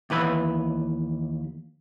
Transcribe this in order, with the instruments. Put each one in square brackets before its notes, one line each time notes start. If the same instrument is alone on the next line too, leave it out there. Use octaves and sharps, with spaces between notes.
[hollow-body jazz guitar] D#2 E3 B4 B5